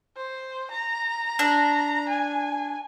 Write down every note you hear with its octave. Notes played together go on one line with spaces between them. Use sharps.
C5
A#5
D4
G#5